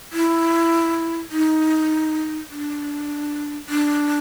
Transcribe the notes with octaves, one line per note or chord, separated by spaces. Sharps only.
E4
D#4
D4
D4